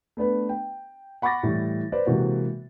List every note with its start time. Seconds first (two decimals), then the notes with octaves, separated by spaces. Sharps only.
0.17 A3 B3 D4 B4
0.49 G5
1.22 F#5 B5 C#6 D6 A6 A#6
1.43 A2 E3 G3
1.92 B4 C5 D5
2.07 C3 E3 G#3 A#3 F#4